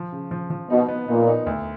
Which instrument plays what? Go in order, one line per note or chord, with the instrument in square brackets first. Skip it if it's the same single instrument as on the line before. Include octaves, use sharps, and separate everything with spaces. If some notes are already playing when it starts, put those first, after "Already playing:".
Already playing: [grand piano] F3
C#3
F3
F3
[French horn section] B2 [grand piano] D#4
[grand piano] B3
[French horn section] A#2 [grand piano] D#4
[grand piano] D#4
D2